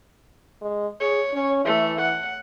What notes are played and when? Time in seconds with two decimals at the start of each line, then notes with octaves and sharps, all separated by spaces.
0.62 G#3
1.01 G#4 C#5
1.34 C#4
1.65 E3 A3
2.01 F#5